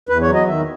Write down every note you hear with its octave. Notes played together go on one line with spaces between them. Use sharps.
E2 B4
C#5
F#3
D#5
D#3 E5